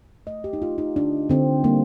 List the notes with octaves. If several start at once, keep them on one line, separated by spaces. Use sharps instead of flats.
A3 D#5
G4
D#4
A3 F4
D#4
D3 D4
D3 C4
G3 A#3